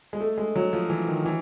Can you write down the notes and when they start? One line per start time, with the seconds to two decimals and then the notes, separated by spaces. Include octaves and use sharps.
0.13 G#3
0.20 A3
0.38 G#3
0.56 F#3
0.73 F3
0.90 E3
1.08 D#3
1.26 E3